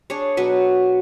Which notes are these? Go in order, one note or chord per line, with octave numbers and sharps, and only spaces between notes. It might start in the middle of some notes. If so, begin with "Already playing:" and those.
D4 G#4 C#5
B2 F#3 B4